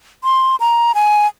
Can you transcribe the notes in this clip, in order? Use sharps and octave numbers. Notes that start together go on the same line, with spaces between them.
C6
A#5
G#5